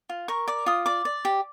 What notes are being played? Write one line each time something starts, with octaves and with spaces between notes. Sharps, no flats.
F4
A#4 C#6
D5 D6
F4 D#6
D5 D6
D5
G4